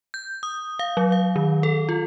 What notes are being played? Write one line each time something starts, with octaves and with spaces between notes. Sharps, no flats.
G6
D#6
F5
F#3
F5
D#3
A4
F4